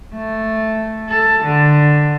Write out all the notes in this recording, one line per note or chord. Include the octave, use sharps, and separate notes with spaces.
A3
A4
D3